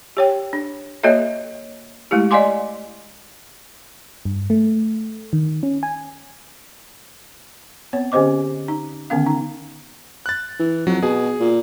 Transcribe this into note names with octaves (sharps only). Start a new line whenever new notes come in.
G4 C#5 G5
D4
A#3 F#4 A4 C#5 D#5 E5
G#3 A3 E4 G4
D5 D#5 F5 G#5 C6 D6
G2
A3
D#3
C#4
G#5
B3 C4 C#5
D3 C#4 G4 C5 D#5 D6
D#4
D3 D#3 B3 C#4 F5
D#4
F#6 A6
E3
F2 F#3
B2 G#4
A#2